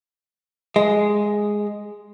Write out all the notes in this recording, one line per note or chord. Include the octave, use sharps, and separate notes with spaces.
G#3